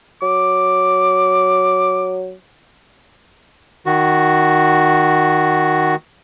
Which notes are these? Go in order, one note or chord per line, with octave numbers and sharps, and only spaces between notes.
F#3 D6
D#3 F#4